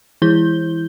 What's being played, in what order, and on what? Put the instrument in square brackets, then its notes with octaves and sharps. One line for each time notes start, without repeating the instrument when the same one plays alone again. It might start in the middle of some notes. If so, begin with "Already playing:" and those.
[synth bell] E3 E4 G6 G7